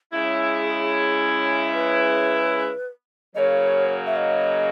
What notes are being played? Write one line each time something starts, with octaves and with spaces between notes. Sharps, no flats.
C#3 G#3 C#4 E4 G#4
B4
C#3 F#3 A#3 C#5 D#5
E5
D#5